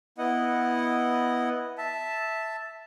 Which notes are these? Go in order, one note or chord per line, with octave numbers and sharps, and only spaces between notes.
B3 E4 D#5 F#5
E5 A5